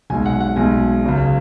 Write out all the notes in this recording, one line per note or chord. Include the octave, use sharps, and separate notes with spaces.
B1 B2 G#3 G#5
F#5
F#5
B1 B2 G#3 G#5
C#2 C#3 F#3